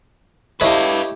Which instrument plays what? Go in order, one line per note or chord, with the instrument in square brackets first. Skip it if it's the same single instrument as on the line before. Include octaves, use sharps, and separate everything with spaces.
[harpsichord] A3 C#5 D#5 [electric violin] E4 G4 [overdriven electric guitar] B4 F5